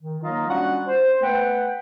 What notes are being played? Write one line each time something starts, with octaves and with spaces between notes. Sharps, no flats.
D#3
F#3 A#3 D#4 F4 D#5 F5
G3 C#4 D4 F4 F#4 F#5
C5
A3 B3 B4 F#5 G5